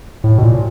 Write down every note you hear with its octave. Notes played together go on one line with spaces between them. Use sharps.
A2
B2
A#2